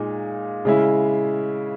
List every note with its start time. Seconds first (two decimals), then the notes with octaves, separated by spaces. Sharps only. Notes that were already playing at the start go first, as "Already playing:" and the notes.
Already playing: A#2 G#3 D#4
0.65 C#3 G#3 C#4 E4